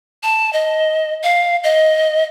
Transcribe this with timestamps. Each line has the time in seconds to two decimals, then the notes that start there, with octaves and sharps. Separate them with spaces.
0.23 A5
0.53 D#5
1.23 F5
1.64 D#5